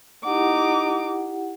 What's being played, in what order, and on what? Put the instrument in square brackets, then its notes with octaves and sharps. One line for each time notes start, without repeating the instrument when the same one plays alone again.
[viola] D#4 D6 [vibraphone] E4 G4 F#5